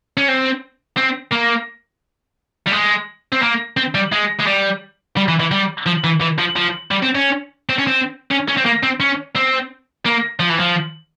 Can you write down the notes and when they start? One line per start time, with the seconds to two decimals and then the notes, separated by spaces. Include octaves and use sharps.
0.17 C#4
0.28 C4
0.97 C4
1.32 A#3
2.67 G3
2.72 G#3
3.33 C4
3.42 A#3
3.77 C4
3.95 G3
4.12 G#3
4.40 G#3
4.47 G3
5.17 G3
5.28 E3
5.40 E3
5.51 G3
5.86 F3
6.04 E3
6.21 E3
6.38 F3
6.56 F3
6.91 G3
7.03 C4
7.15 C#4
7.69 C4
7.78 C#4
7.87 C4
8.31 C#4
8.48 C#4
8.57 C4
8.65 A#3
8.83 C4
9.00 C#4
9.35 C4
10.05 A#3
10.40 F3
10.49 E3
10.59 F3